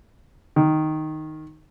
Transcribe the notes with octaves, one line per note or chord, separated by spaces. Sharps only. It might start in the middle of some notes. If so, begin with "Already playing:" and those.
D#3